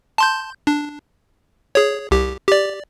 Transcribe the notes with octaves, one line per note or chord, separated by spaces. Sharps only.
A5 C6 G6
D4
G#4 C#5
C2 G4
G4 D5